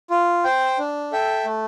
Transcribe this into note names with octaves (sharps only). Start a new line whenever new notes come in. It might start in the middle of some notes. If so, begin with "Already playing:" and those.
F4
C5 G5
D4
A4 E5 G5
A3